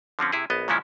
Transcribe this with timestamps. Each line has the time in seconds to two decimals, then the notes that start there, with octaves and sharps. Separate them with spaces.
0.19 D3 F3 C4 C#4
0.32 C3 E4 G#4
0.50 A#1 B3 D#5
0.68 A#2 C#3 F3 G#3 C#4 E4